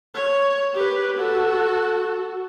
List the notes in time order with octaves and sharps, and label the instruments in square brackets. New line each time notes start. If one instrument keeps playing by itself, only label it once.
[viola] C#5
G4 B4
F#4 A4